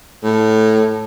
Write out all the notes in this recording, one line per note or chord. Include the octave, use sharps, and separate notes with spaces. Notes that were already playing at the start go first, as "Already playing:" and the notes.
A2